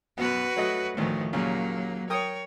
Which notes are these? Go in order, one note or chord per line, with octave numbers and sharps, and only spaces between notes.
F#2 B2 B3 F#4 B4
F#3 A3 D#5
D2 A2 D#3 F3
D#2 A#2 C#3 F#3 A#3
A#4 C#5 G5 D#6